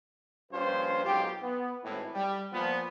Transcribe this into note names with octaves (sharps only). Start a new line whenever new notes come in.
A#1 G2 C#4 F4 B4 C5
B1 G#2 F4 G4
B3
G#1 A2 E3
G3
A#2 F3 B3